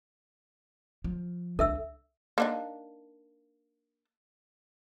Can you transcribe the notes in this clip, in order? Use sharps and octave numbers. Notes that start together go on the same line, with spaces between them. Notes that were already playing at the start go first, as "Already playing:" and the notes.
F3
C2 D4 A4 E5 E6
A#3 D4 D#4